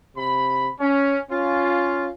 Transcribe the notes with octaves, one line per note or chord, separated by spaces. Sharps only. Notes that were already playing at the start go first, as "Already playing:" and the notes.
C3 B5
C#4
C#4 F4